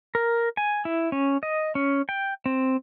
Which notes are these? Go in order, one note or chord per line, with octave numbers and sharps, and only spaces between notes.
A#4
G#5
E4
C#4
D#5
C#4
G5
C4